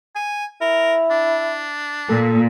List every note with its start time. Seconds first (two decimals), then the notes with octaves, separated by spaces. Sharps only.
0.16 G#5
0.61 E4 A#4
1.11 D4
2.09 A#2 A4